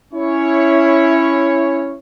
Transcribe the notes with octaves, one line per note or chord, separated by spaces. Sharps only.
C#4 E4 C#5